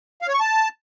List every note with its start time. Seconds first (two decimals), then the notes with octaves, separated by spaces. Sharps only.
0.22 F5
0.28 C#5
0.34 C#6
0.40 A5